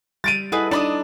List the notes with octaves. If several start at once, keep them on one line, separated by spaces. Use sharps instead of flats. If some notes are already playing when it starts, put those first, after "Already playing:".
G3 A6 D7 D#7
E4 G#4 A4 B4 D#5 F#5
D4 D#4 A5 B5 D#6